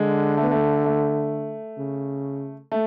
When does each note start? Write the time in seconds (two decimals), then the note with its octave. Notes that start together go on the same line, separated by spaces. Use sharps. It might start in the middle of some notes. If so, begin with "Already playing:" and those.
Already playing: D3 G#3
0.37 A3
0.44 B3
0.51 A3
0.85 A3
1.78 C#3
2.72 A3